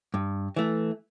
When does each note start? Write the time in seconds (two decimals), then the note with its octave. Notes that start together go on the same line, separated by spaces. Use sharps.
0.14 G2
0.56 E3 A3